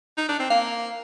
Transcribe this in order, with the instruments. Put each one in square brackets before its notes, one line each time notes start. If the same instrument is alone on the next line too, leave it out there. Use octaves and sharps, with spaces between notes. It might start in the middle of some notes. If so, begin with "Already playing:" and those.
[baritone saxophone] D#4
D4
C4
[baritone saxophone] A#3 [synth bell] F5